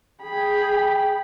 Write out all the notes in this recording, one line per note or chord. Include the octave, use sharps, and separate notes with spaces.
G#4 G5 B5